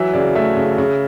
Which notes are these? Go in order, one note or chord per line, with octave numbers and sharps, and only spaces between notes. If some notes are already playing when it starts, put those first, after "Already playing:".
Already playing: E3 F#3 E5
C#3 D5
A3 E5
C#3
C#3